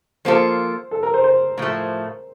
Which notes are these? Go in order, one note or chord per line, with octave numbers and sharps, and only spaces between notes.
F3 A#3 F4 A4 C5
A4
A#4
C5
C5
A2 F3 A3